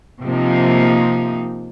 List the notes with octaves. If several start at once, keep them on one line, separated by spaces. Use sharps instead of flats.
C3 F3 A#3 D#4